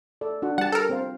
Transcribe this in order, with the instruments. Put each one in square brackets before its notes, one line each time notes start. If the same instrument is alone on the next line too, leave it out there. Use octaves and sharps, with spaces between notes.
[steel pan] A4 D5
D4 F#4 F#5
[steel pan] G3 G4 [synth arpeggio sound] F#5 A5
[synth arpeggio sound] A4 A#4
[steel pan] C4 C5 F5